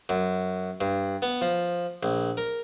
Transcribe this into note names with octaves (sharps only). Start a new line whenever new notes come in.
F#2
G2
B3
F3
A#1
A#4